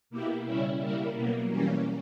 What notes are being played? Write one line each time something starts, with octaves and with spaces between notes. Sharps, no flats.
B2 A#3 E4 G4
C#3 G3 C#4 E4
G3 A#3 E4 A#4
B2 F#3 A#3
E3 G3 A#3 C#4